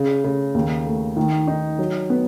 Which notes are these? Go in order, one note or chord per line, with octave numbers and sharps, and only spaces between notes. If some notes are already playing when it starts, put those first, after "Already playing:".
Already playing: C#3
C#3
D#2
A3
D#3
D#4
F#3
B3